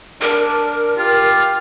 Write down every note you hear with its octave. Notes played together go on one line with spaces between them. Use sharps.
D4 A#4
F4 G4